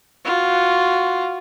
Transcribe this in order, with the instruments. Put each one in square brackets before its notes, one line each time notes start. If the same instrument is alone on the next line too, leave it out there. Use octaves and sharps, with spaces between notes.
[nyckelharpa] F4 F#4